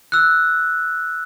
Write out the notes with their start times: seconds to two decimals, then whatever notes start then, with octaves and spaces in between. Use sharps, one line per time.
0.12 E6 F#6